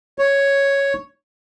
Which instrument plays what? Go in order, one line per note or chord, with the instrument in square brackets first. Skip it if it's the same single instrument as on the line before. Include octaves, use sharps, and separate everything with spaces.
[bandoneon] C#5